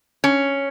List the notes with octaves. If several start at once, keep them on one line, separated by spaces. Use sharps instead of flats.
C#4